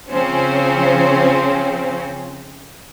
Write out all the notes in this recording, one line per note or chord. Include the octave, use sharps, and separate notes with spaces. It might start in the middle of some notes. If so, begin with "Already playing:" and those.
C#3 F3 C4 C#4 C5